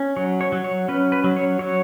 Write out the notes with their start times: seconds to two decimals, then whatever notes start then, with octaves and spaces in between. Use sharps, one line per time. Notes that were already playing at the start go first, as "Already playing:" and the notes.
Already playing: C#4
0.17 F#3 C#5
0.41 C#5
0.52 F#3
0.64 C#5
0.88 C#4 B4
1.12 B4
1.24 F#3
1.37 C#5
1.59 F#3 C#5